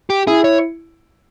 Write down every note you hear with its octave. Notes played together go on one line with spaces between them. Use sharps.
G4
E4 G#4
C#5